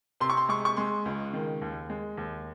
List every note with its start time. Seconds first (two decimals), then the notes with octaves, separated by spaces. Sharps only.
0.20 C3 C6
0.30 C#6
0.37 C6
0.49 G#3 C#6
0.65 C#6
0.77 G#3 C6
1.06 C#2
1.33 D#3
1.62 D#2
1.90 G#3
2.17 D#2